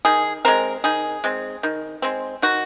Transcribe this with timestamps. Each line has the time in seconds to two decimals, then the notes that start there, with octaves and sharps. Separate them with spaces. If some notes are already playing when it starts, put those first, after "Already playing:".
0.05 D#3 G#4
0.45 G#3 C4 A#4
0.84 D#3 G#4
1.24 G#3 C4
1.63 D#3
2.02 G#3 C4
2.42 D#3 F#4